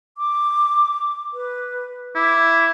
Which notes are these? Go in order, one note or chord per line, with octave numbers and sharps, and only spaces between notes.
D6
B4
E4 D6